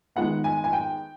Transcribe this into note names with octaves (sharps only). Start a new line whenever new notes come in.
D#3 G#3 B3 F#5
G#5
G#5
G5